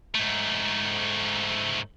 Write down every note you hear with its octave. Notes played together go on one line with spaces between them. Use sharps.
G#2 A3